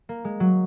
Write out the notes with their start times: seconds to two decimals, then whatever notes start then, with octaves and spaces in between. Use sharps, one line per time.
0.09 A#3
0.25 G#3
0.40 F#3